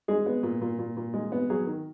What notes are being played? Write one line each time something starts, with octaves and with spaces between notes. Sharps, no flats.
G#3 G#4
B3
A#2
A#2
A#2
A#2
G#3
B3
F#3 G#4
D#3